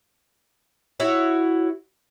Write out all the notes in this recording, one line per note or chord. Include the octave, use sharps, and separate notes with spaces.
E4 F#4 C#5